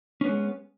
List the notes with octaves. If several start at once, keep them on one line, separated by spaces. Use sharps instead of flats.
G#3 B3 C#4